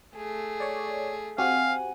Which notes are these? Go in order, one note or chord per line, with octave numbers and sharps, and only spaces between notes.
A3 G#4
C#5 D5
C4 F#4 G4 F5 F#5 G#5